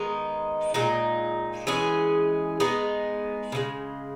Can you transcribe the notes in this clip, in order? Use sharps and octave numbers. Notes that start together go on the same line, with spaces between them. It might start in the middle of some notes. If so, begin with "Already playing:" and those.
Already playing: D#3 G#3 B3 D#4
A#2 G#3 D#4
E3 G#3 C#4 G#4
G#3 B3 D#4 G#4
C#3 E3 G#3